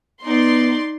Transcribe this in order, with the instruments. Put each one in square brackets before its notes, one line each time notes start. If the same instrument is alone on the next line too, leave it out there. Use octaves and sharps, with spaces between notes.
[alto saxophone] B3 [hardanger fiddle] D#4 D5 [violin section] C6